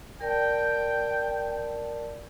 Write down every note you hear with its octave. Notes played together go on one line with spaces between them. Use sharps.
A#4 D5 G5 A5